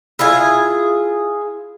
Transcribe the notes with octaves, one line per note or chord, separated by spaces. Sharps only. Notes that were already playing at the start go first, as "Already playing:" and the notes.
E4 F4 G#4 G#5